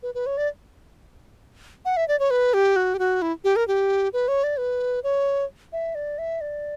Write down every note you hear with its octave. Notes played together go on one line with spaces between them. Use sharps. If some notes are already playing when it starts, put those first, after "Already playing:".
B4
B4
C#5
D5
F#5
E5
D5
C#5
B4
G4
F#4
G4
F#4
E4
G4
A#4
G4
B4
C#5
D5
B4
C#5
E5
D5
E5
D5